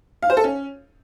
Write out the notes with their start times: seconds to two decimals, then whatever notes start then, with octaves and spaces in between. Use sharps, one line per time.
0.23 F5
0.30 C5
0.37 A4
0.44 C#4